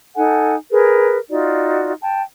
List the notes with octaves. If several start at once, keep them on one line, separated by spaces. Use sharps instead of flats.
D#4 A4 F#5 G#5
G#4 A#4 B4
D#4 F4 F#4 D5
G5 A5